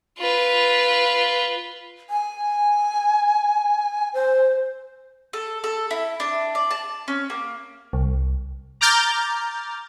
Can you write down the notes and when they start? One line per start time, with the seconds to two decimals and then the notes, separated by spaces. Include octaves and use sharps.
0.18 F4 B4
2.10 G#5
4.14 C5
5.33 A4
5.64 A4
5.91 E4
6.20 D4
6.55 D5
6.71 A5
7.08 C#4
7.30 A#3
7.93 C2
8.81 A#5 D6 F6 G6 A6